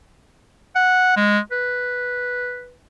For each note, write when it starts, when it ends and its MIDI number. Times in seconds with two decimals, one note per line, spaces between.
0.75 1.12 78
1.16 1.39 56
1.51 2.74 71